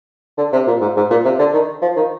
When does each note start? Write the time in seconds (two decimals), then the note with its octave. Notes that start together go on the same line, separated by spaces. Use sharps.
0.38 D3
0.52 C3
0.67 A#2
0.81 G#2
0.96 G#2
1.10 A#2
1.25 C3
1.39 D3
1.53 D#3
1.82 F3
1.96 D#3